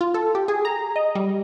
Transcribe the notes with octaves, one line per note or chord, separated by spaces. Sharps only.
F4
A4
G4
G#4
A#5
D#5
G3